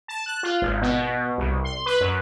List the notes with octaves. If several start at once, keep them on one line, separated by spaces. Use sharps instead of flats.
A5
F#6
F4
G#1
B2
C2
C6
B4
F#2